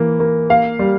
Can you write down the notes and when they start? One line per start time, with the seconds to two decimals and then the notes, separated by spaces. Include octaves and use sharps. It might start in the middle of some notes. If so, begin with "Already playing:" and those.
Already playing: E3 A#3
0.20 A#3
0.50 A#3 F5
0.79 G3